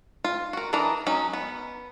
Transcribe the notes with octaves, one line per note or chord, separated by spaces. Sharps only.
F4
F#4 A#4
E3 D4 D#4 A#4 A#5
F#3 C#4 D#4
B3